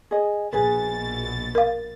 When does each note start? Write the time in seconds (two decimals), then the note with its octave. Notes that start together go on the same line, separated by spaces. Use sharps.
0.11 G#4 D#5
0.53 A#1 B2 G#4 B4 A6
1.55 A#4 F5